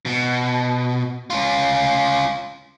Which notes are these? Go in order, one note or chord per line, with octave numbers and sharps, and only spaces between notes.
B2
C#4 F4